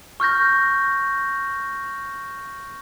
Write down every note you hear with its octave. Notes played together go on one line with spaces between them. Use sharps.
C#6 F6 G6 A#6